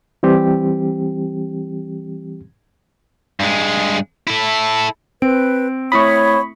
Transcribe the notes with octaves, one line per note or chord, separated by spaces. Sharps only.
E3 G3 C4 G4
G2 G#3
E4 A4
C4 B4 D7
A3 E4 C#5 B5 C#6 D#6